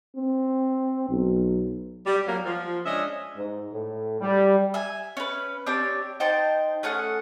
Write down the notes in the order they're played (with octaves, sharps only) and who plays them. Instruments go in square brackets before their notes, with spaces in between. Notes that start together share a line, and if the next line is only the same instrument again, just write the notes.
[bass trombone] C4
B1
[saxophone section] G3
F2 F#3 G3 A#3
F3
G#3 C#4 D4 D#5 E5
[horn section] G#2
A2
G3
[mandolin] E5 G#5
C#4 B4
C4 D4 G4 C#5
D#4 C5 G5 A5
A3 C#4 G#4 F#5